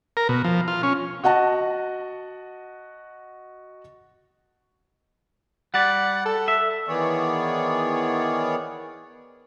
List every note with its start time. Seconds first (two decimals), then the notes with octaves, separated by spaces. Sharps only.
0.17 A#4
0.29 B2
0.44 F3
0.68 F4
0.83 C#4
1.24 F#4 D#5 F#5 A5
5.74 G3 D5 F#5
6.26 A4
6.48 E5
6.88 D#3 E3 B3 G#4 C#5 D5